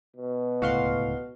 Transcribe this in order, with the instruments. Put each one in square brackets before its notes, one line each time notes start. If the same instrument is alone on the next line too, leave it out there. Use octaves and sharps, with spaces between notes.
[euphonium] B2
[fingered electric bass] D1 C#2 A2 [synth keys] F#4 F5 C6